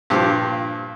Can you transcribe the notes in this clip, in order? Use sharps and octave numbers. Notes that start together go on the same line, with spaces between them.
G2 A#2 F3 G4